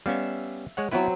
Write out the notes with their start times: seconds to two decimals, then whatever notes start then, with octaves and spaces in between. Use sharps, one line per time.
0.06 G3 B3 C#4 E5 F5
0.77 G#3 C#5 F#5
0.91 F#3 B3 C4 E4 B4